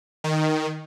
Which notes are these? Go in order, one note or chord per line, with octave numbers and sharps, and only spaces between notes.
D#3